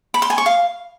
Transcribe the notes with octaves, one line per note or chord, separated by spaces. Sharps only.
B5
C6
G#5
C#6
F5